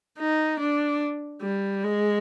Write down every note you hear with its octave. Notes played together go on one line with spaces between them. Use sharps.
D#4
D4
G3
G#3